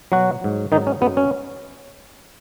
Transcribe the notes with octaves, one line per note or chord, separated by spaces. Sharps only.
B2 F#3 F#4
G#2 F#3
G#2 D#3 F#3 D#4
C#4
F#2 F#3 B3
C#4